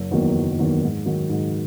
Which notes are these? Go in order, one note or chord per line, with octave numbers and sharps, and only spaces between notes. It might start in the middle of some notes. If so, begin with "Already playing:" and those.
Already playing: F#1
E2 D#3 F#3 A#3
F#1
E2 D#3 F#3 A#3
G#2
D#3 F#3
G#2